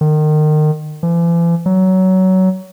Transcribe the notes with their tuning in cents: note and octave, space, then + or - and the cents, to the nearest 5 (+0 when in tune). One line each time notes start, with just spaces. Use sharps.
D#3 -30
E3 +45
F#3 +20